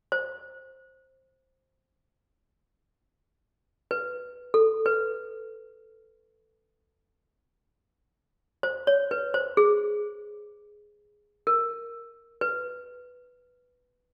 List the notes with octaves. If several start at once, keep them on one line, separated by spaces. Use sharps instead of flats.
C5
B4
A4
B4
C5
C#5
B4
C5
G#4
A#4
B4